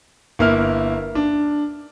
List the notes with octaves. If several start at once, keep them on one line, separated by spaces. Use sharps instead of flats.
G1 A#3 E4 F6
D4